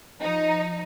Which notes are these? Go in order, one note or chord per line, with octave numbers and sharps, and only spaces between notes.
F3 D#4